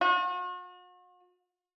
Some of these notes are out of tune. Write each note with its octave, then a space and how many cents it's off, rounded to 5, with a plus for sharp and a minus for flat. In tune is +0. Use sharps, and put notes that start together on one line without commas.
F#4 -45